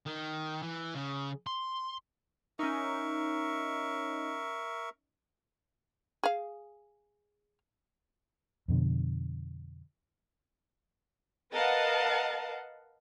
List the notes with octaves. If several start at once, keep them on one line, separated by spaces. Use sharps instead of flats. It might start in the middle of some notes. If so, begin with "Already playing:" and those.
D#3
E3
C#3
C6
C#4 D#4 A#4 E5 C#6
G#4 F5
F2 B2 D3
A#4 B4 D#5 F5 F#5 A5